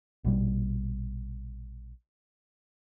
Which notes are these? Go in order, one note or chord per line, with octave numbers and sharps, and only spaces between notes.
A#1 B2 D#3 G3